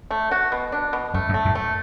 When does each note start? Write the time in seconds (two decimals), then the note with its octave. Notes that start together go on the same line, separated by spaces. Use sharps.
0.11 A3
0.31 F#4
0.52 B2
0.72 D4
0.93 B2
1.14 F#2 A3
1.29 F#2
1.34 A3
1.45 F#2 A2
1.55 A3